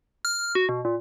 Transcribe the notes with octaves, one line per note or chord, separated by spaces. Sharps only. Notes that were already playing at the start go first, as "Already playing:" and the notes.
F6
F#4
B2
A#2